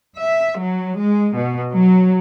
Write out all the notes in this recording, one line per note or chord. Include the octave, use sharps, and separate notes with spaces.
E5
F#3
G#3
B2
F#3